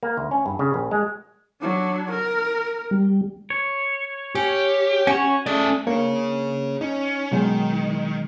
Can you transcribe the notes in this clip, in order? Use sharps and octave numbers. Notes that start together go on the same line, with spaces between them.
A#3
D2
C#4
G2
C#3
A#1
G#3
F#3 D4
A#4
G3
C#5
C#4 G4
C#4 F#4 C#5
A3 C#4 G#4 D5
A#3 D4 G#4 C#5
C#4 D#4
B2 D#3 F#3 G#3